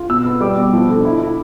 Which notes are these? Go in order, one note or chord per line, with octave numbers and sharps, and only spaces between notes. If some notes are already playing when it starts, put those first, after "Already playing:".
Already playing: F4
B2 E6
B3
G3 D6
B2
F3
D3
E4
E4